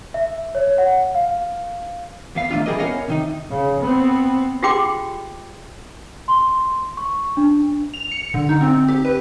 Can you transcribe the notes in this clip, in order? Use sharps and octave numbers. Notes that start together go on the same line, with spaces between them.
E5
C#5
F#5
F5
E2 B3 F5
D#3 E3 A3 D4 F4
E3 G3 G#4 A#4 D#5
B3 C#4 A#4 C#5 D#5 F5
C3 D#3 D#4
C#3
B3 C4
F4 G4 G#4 G5 C6 D6
C6
C#6
D4
F7
C#7
D3
D#4
C4
C4
G4
B4